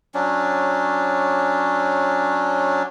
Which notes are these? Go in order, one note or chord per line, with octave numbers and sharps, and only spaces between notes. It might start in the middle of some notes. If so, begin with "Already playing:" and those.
F#3 C#4 D4